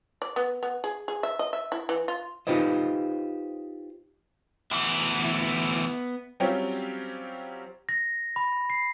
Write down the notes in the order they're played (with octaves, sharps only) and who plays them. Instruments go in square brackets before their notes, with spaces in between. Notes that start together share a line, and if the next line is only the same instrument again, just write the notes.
[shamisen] D5
B3
B3
G#4
G#4
E5
D#5
E5
E4
E3
F4
[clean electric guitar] D#4 F4 G4 B4 C5 D#5
[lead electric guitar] D2 E3 [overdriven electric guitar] B3 E5
[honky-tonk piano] F#3 G3 C4 C#4 F4 G4
[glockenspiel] A#6
B5
C7